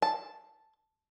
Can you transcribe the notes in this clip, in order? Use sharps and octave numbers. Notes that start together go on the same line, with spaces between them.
A5